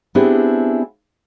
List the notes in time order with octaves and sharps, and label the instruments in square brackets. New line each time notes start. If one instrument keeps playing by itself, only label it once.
[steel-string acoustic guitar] B3 C4 D4 E4 G4 G#4